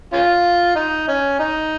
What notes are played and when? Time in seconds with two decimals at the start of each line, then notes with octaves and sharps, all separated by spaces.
0.13 C#4 F4
0.76 D#4
1.08 C#4
1.39 D#4